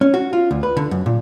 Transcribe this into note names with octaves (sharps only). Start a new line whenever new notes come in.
C#4
F#4
F4
D2
B4
D3
F#2
A#2